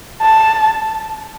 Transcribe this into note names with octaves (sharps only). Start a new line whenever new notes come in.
A5